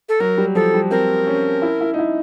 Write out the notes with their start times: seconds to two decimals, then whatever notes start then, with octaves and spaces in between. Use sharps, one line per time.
0.09 A4
0.20 F#3 A#4
0.38 G3
0.55 F3 A4
0.74 G3
0.91 C4 A#4
1.27 C#4
1.62 E4
1.81 E4
1.94 D#4
1.99 E4